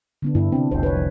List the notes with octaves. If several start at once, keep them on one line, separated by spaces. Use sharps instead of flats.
D3 B3 D4
G2 B3 E4
C3 C4 D4
F1 C2 C5
B4 C#5
F3